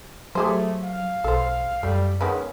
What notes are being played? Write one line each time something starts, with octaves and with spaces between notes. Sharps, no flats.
F#3 A3 G4 G#4 C5
F5
B1 A4 C5
F#2 G3 A3
D#3 G#3 B3 C#4